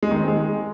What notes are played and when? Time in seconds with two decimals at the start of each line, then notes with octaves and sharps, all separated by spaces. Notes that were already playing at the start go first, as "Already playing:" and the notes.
0.03 G#3
0.11 D#3
0.20 C4
0.28 G#3